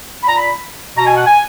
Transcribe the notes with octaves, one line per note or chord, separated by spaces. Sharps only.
A#2 B5
A#5
B5
B2 A#5
G#5
F#5
G#5